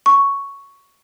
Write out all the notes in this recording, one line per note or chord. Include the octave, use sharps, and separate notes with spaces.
C#6